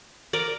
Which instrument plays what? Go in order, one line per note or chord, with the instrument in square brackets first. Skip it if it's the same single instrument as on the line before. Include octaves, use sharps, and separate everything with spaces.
[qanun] A#4 D5